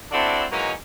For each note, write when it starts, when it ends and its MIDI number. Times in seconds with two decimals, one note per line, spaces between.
0.12 0.45 60
0.12 0.45 62
0.12 0.45 64
0.12 0.45 66
0.12 0.45 69
0.51 0.72 52
0.51 0.72 54
0.51 0.72 56
0.51 0.72 58
0.51 0.72 61
0.51 0.72 63